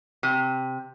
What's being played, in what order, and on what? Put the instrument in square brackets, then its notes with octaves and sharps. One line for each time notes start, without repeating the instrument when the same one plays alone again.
[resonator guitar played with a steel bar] C3